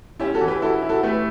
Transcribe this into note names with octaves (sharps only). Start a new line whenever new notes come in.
C#4 E4 G4
F#4 A4
E3
G4 B4
E4 F#4 A4
E4
F#4 A4
A3 G4 B4